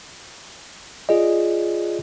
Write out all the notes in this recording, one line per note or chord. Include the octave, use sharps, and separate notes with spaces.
F4 G#4 D5 D#5